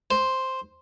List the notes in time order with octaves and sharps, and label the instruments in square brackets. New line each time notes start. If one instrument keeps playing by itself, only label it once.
[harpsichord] C5